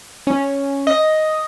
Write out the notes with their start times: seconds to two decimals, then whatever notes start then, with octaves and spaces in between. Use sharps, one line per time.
0.27 C#4
0.87 D#5